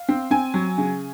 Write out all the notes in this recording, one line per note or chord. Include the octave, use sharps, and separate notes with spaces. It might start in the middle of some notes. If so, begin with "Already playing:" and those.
Already playing: F5
C4
C4 G#5
F#3
C#3